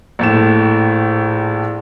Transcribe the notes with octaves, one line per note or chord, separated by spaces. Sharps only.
A#1 A2 E7